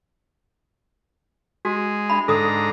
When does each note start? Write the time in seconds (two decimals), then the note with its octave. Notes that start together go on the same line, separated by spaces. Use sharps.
1.65 G#3 F#4
2.10 D4 E5 B5
2.28 G#2 D3 A4 A#5 D#6